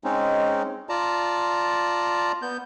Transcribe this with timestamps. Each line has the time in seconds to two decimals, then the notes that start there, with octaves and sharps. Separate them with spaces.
0.04 G#3 C4 C#4 D#4
0.89 F4 D5 A5 A#5
2.42 B3 G6